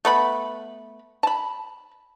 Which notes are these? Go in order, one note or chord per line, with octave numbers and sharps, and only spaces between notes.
A3 B3 B5
A5 B5